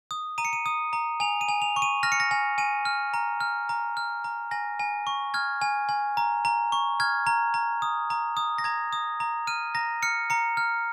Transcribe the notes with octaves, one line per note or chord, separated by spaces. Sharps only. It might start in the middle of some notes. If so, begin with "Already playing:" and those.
D#6
A#5 D#7
C#7
D#7
D#6
A#5
G#5 F7
D#7
G#5
F7
C#6
D#7
F6 A#6
C#7
A#6
G#5
G#5 D#7
F6
A#5
F6
A#5
F6
A#5
G#5 A#6
G#5
C#6
F6 G#6
G#5
G#5
A#5
A#5
C#6
F6 G#6
A#5
A#5
D#6
A#5
D#6
A#6
A#5 G#6
D#6
A#5
F6 D#7
A#5 A#6
F6 C#7
A#5 C#7
F6